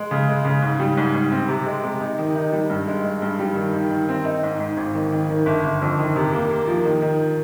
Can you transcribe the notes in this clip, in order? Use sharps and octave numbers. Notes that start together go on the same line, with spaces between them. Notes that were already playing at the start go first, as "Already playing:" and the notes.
Already playing: G#3
C#3
G#3
C#3
G#2
G3
G#2
G#2
C4
C3
G#3
C3
D#4
D#3
D#4
G3
G2
G#3
G#3
G2
G3
D#3
D#3
D#3
C4
D#4
G#2
G#2
G#1
D#3
D#3
D#3
G1
G1
F2
D#3
C3
A#3
A#3
F3
D#3
D#3